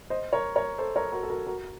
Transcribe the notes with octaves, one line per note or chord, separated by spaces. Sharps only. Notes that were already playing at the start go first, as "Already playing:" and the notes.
C5 D#5
A#4 C#5
A#4 C#5
A4 C5
A#4 C#5
F#4 A#4
A4
F#4 A#4
F#4 A#4